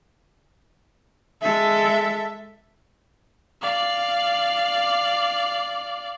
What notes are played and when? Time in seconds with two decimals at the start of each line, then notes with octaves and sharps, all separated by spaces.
1.42 G#3 A4 E5
3.61 D5 F5